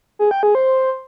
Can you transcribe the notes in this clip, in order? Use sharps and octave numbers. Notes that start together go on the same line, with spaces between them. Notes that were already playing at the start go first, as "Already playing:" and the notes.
G#4
G5
G#4
C5